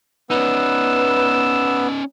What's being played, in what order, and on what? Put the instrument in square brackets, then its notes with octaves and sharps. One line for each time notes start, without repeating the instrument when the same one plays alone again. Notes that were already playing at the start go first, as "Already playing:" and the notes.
[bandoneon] B3 [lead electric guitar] C#4 D#4 [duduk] B4 [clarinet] E6